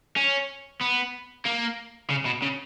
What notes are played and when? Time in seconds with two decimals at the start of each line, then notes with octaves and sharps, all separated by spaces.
0.16 C#4
0.81 B3
1.45 A#3
2.10 C#3
2.26 B2
2.42 C#3